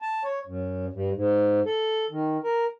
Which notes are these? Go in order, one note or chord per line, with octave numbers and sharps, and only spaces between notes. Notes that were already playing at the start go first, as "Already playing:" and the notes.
A5
C#5
F#2
G2
G#2
A4
D#3
A#4